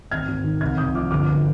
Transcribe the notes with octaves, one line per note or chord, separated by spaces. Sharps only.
G#1 F6 G#6
G#1
D#3
C2 F6 G#6
C2 D#6 G6
F3 D6 F6
G1 D6 F6
G1